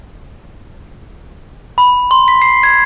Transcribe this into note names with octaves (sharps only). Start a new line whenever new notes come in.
B5
C6
B6
C7
G#6